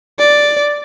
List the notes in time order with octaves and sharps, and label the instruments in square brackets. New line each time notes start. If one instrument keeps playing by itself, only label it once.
[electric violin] D5